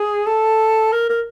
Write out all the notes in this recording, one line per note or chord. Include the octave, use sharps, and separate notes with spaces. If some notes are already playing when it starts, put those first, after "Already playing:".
Already playing: G#4
A4
A#4
A#4